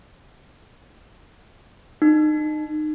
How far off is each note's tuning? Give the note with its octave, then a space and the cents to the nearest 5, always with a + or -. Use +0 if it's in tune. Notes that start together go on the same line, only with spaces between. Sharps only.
D#4 -30